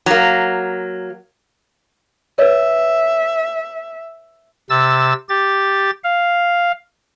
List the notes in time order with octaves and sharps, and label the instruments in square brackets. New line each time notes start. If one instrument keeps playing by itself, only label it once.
[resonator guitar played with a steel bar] F#3 A#3
[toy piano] B4 C#5 [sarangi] E5
[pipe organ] C3 E6 A6
G4 A6
F5